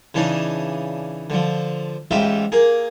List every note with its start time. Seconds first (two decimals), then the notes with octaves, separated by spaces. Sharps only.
0.15 C#3 E3 D4 D#4
1.30 D3 F3
2.11 A1 G#2 F4 G4 E5
2.52 A#3 G#4